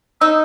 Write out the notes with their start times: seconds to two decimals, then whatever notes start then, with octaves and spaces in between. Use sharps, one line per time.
0.21 D#4 E6